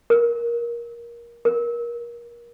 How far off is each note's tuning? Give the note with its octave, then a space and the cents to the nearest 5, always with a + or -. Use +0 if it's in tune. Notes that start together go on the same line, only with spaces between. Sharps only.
A#4 +15
A#4 +25